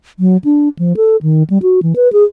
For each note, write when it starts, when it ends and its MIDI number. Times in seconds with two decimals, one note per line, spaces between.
0.19 0.37 54
0.44 0.69 62
0.79 0.96 53
0.97 1.17 69
1.22 1.43 51
1.50 1.58 55
1.62 1.80 66
1.83 1.93 52
1.96 2.11 71
2.13 2.24 68